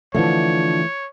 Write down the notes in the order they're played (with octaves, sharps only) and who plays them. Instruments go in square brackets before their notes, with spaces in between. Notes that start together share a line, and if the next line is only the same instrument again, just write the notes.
[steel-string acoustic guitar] D3 F3 [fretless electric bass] E3 A3 [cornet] C#5